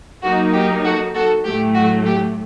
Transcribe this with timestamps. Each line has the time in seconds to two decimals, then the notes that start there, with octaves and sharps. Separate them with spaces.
0.23 F#3 A#3 D#4 F#4
0.53 G4
0.84 F#4 A4
1.14 F#4 A4
1.45 A2 F#3 A3 G4
1.75 F#4
2.06 G4